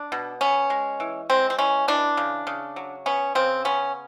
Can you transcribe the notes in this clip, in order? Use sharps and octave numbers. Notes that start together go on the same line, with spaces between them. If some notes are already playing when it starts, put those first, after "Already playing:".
Already playing: D4
B2
B3 C#4
G#3
E3
G#3 C4
C4
E3 C#4
E3 D4
C#3
C#3
F#3
B3 C#4
C#3 C4
B3 C#4